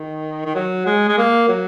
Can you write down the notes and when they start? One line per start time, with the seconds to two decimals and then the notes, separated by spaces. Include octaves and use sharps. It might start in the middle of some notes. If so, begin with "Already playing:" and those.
Already playing: D#3
0.46 D#3
0.55 F#3
0.86 G#3
1.09 G#3
1.18 A#3
1.48 F#3